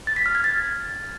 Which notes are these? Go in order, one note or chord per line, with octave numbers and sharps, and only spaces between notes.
A6
B6
F6
G#6
A6